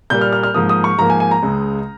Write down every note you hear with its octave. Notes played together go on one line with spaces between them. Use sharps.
A#2 G3 A#3 G6
F6
F6
F6
G#2 F3 A#3 D#6
D#6
C#6
G#2 F3 A#3 A#5
G#5
G#5
A#5
C#2 C#3 G#3